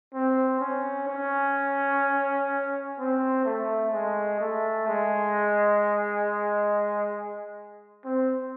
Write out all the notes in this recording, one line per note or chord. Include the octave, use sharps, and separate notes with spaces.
C4
C#4
C#4
C4
A3
G#3
A3
G#3
C4